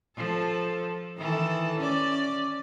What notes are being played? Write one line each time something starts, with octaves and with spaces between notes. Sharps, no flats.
F3 A4
D#3 E3 A4
C#4 D5